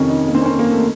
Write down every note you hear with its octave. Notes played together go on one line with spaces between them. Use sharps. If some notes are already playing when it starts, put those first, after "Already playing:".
Already playing: F2 C3 D#3 C#4
D#4
A#3
C4
C#4
C4
A#3
A3